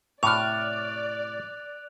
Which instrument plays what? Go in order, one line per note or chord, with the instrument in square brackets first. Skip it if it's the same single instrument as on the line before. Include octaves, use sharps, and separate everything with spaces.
[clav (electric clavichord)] A2 C3 [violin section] D5 [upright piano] C#6 D6 F6 [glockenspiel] F#6 F7